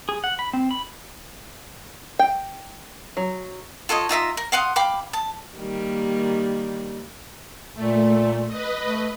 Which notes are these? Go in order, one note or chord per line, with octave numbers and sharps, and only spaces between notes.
G#4
F#5
B5
C4
B5
G5
F#3
F4 A4 C#5 D#5
D#4 F4 E5 A#5
A#4
F5 F#5 C6 D#6
F5 G5 B5 D6
A5
D#3 G3 A#3
A#2 A3
B4 D#5
A3